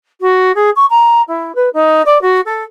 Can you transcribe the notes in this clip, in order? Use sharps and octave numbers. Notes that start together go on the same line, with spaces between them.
F#4
G#4
C#6
A#5
E4
B4
D#4
D5
F#4
A4